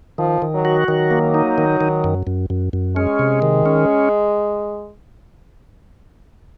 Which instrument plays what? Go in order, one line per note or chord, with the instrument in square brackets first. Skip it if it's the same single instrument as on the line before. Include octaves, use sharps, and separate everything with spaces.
[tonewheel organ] D#3 [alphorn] F3
[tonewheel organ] D#3
[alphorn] F#3
[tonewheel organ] F#4
[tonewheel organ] D#3 [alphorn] F#3
[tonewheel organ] A#3
D#4
D#3
D#3
F#2
F#2
F#2
F#2
[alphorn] G#3 [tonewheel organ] C#4
[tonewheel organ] C3
D#3
C#4